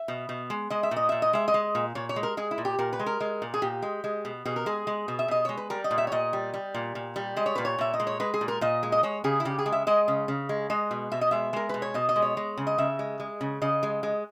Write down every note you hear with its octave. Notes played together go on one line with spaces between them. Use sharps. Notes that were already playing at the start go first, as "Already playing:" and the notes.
Already playing: E5
B2
B2
G#3
G#3 D#5
E5
A#2
D#5
A#2 E5
D#5
G#3 E5
D#5
G#3
A#2
A#2 C#5
C#5
G#3
A#4
G#3 G#4
E4
A#2
G4
A#2 A#4
B4
G#3
A#4
G#3
A#2
G#4
A#2 G4
G#3
G#3
B2
B2 G#4
A#4
G#3 G#4
G#3
B2
E5
B2 D#5
G#3 C#5
B4
G3 A#4
D#5
A#2
E5
C#5
A#2 D#5
G3
G3
A#2
A#2
G3
G#3 D#5
C#5
A#2 B4
C#5
A#2 E5
D#5
G#3
C#5
G#3 B4
G#4
A#2
A#4
A#2 D#5
G#3
D#5
G#3 C#5
C#3 G#4
E4
C#3 G4
G#4
G#3
E5
G#3 D#5
C#3
C#3
G#3
G#3 D#5
B2
B2 E5
D#5
G#3 E5
G#3 A#4
B2 B4
C#5
B2 D#5
D#5
G#3
C#5
G#3
C#3
D#5
C#3 E5
G#3
G#3
C#3
C#3 D#5
G#3
G#3